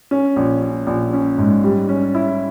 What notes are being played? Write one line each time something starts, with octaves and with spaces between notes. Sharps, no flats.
C#4
A#1
C#4
A#1
C#4
G#2
G3
C#4
E4